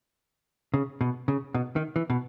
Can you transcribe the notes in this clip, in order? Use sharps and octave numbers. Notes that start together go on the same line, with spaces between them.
C#3
B2
C#3
B2
D#3
E3
B2